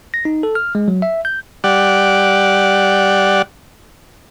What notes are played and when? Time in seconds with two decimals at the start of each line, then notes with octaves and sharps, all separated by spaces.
0.14 A#6
0.25 D#4
0.43 A4
0.55 F6
0.75 G#3
0.88 F#3
1.02 E5
1.25 G6
1.64 G3 D5 F#5